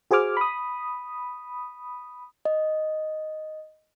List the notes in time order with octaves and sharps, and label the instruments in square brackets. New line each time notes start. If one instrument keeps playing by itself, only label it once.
[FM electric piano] F#4 G#4 C5 G#5 D6 F6
B5 D#6
[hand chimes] D#5